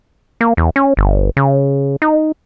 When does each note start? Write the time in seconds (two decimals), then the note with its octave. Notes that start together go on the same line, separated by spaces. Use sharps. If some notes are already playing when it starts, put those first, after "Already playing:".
0.41 A#3
0.57 E2
0.76 C#4
0.97 G1
1.37 C#3
2.02 D#4